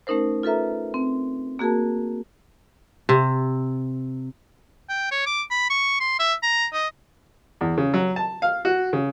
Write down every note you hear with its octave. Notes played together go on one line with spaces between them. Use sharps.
A3 C#4 D#4 A#4 C5
F4 A4 B4 E5 A#5
C4
A#3 F#4 G#4 A#4 A5
C3
G5
C#5
D6
B5
C#6
C6
E5
A#5
D#5
E2
C#3
F#3
A5
F5
F#4
C#3